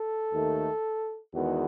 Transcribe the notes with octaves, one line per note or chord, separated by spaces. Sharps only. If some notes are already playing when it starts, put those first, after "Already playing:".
Already playing: A4
D#2 D#3 A3
E2 D#3 G#3 B3 F#4